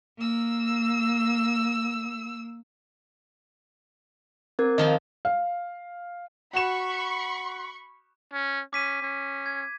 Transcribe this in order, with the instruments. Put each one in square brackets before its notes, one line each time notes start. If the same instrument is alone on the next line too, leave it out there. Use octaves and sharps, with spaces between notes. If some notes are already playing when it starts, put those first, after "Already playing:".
[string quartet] A#3 E6
[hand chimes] C4 A#4 G#6
[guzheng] D#3 F3 D#4 [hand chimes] D#5
[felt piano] F5
[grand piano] F#4 E7 [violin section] B5 C#6
[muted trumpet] C#4
[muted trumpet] C#4 [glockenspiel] D6 B6 D#7
[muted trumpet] C#4
[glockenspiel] G#6